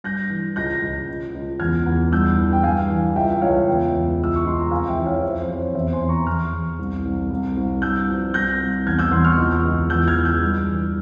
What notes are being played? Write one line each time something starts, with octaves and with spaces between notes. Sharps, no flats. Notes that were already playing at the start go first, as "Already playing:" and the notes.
G2 G6 A#6
E3
C#2 G6 A#6
C#2
C#2
C#2
E2 F6 G#6
E2
G2 E6 G6
E3
G5
G2 F5 G#5
E3
C#2 E5 G5
C#2 C#5 F5
E2 E5 G5
E2
C#2 E6
C#6
C#2 C6
A#5
F2 F5 G#5
E5 G5
E3
C#5 F5
F2 C5 E5
C5
F2
C#5
E2 C5 E5
G#5 C6
E2
A#5 C#6
E2 C#6 F6
E2
C2
C2
C2
C2
G2 E6 G6
F3
C2 G6 A#6
C2
E2 F6 G#6
E6 G6
E2 C6 E6
C#6 F6
C#2
C#2
E2 E6 G6
F6 G#6
E3
E6 G6
G2
E3